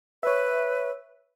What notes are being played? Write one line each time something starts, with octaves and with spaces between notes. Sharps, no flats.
B4 C#5 E5